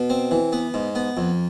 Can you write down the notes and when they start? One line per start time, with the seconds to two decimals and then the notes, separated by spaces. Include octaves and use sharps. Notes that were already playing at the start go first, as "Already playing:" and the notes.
Already playing: B2
0.10 C4
0.31 E3
0.52 B3
0.74 G#2
0.95 B3
1.17 F2